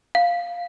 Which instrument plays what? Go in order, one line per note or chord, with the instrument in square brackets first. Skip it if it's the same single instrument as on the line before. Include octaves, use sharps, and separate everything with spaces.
[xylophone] F5